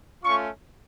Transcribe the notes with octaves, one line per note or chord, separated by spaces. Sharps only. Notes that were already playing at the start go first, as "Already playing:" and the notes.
A3 C#4 F4 C#6